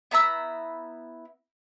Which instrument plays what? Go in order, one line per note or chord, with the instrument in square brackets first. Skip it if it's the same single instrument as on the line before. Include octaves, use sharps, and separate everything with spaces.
[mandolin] B3 E4 A#5 E6